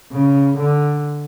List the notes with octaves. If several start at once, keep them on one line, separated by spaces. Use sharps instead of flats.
C#3
D3